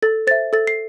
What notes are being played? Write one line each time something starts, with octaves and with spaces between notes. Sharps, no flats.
A4 A6
C5 E5 A6
A4 A6
C7